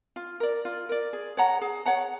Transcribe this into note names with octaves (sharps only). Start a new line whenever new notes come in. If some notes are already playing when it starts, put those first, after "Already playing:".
F4
A#4 D5
F4
A#4 D5
G#4
C#5 F#5 A#5
G#4
C#5 F#5 A#5